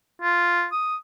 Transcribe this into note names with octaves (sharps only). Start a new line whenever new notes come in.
F4
D#6